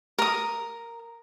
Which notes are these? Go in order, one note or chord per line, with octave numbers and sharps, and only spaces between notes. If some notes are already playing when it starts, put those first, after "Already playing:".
A#4 D#6